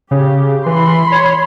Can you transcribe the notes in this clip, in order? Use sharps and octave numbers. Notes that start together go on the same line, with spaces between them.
C#3 G4
E3 B5 C6
C#5